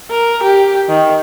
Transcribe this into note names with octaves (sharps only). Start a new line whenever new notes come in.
A#4
G4
D#3